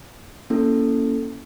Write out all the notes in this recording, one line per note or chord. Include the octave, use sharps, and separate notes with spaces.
A#3 C#4 E4 A4